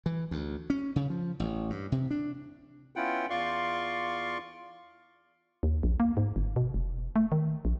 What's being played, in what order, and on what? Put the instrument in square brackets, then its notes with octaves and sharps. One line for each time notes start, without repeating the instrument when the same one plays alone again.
[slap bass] E3
D2
C#4
C#3
F3
A1
G2
C3
D4
[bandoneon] B3 C#4 E4 F4 F#5 G5
E2 F4 D5 F5 C6 C#6
[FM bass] D#2
A#1
A#3
G#2
G1
B2
F1
A3
D#3
A#1